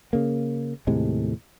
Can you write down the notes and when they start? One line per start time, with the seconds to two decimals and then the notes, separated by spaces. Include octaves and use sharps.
0.13 C#3 A#3
0.87 D#2 A2 C3 G#3